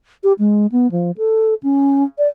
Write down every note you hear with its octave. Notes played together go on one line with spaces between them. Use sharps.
G4
G#3
B3
F3
A4
C#4
D5